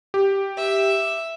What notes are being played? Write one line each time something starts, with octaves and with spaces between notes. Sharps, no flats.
G4
E5